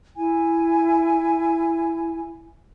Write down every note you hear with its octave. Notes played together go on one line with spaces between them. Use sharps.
E4 G#5